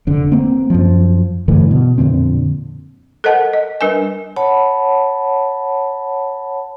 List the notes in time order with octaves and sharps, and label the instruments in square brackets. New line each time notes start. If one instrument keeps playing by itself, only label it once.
[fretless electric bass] F1 D3
A#3 C4
F#2 F3
G2 D3 E3 A3
B2
F2 A#2 D3 C4
[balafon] A4 A#4 C5 D#5 F#5 A5
D#5
G3 D4 A#4 B4 G#5
[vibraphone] C#5 F#5 A5 B5